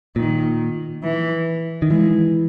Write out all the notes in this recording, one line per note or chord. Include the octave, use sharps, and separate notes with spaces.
A#2 D#3
E3
D#3
E3 G#3